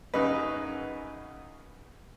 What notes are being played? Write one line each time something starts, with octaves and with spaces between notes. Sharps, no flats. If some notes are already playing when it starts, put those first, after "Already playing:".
F#2 C#3 D#4 B4